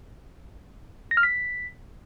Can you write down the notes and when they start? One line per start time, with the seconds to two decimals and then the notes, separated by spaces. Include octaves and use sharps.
1.11 A#6
1.17 F6
1.23 B6